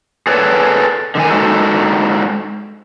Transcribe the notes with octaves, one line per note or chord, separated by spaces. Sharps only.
G#4 A4 B4 C#5 D5
D3 D#3 G#5
G#3 D4 D#4 F#4 A4